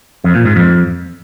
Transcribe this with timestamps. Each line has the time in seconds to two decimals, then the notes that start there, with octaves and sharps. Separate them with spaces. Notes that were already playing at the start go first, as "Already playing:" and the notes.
0.24 F2
0.35 A#2
0.45 G#2
0.56 F2